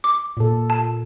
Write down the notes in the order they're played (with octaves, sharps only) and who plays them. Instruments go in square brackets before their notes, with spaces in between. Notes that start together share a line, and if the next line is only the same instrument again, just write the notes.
[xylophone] D6
[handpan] A#2 A4
[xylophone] A5